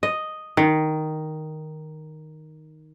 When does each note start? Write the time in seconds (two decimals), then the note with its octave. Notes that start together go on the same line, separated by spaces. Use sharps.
0.03 D#5
0.57 D#3